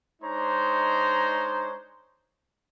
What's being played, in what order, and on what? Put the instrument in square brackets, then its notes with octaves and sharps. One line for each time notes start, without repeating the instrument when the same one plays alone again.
[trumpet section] G#3 D4 D#4 C5 C#5 A#5